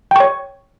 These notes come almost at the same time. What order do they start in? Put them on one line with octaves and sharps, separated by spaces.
G5 C#6 C#5